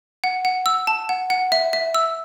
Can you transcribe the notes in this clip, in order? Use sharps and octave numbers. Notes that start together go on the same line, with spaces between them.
F#5
F#5
E6
A5
F#5
F#5
E5
E5
E6